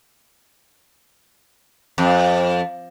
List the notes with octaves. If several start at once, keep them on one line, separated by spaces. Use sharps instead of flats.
F2